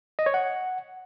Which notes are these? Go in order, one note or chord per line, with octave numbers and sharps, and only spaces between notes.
D#5
C#5
F#5